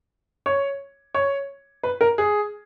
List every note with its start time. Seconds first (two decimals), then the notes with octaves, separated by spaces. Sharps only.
0.46 C#5
1.15 C#5
1.83 B4
2.01 A#4
2.18 G#4